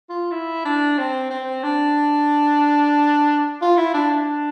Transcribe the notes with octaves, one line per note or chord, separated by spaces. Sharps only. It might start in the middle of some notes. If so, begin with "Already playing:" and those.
F4
E4
D4
C4
C4
D4
F4
E4
D4
D4